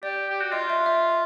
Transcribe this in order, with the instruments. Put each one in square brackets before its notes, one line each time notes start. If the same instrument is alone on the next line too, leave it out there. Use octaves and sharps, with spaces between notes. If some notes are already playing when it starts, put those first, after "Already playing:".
[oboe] G4 [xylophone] D5
[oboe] G4
F#4
[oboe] F4 [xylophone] D#5
[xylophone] E5
E5